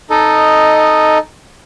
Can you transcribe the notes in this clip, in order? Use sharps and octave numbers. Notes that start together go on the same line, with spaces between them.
D#4 A4 D#5